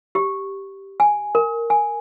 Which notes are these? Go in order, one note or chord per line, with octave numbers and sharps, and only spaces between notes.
G4
G#5
A#4
G#5